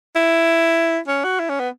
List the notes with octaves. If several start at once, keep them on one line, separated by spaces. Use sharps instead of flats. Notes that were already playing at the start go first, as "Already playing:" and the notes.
E4
C#4
F#4
E4
C#4
B3